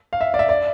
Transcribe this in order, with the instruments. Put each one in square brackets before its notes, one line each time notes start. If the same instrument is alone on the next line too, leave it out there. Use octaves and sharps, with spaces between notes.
[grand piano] F5
E5
D5
E5
D5